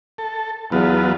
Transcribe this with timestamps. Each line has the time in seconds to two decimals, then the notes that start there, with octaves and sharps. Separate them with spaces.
0.18 A4
0.72 E2 F#3 B3 F4